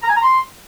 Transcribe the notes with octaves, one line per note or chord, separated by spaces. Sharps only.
A#5
G#5
A#5
C6